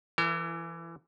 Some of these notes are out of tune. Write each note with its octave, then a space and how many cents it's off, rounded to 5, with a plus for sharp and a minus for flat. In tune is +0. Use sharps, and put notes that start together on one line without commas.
E3 +20 E4 +35 A#4 -40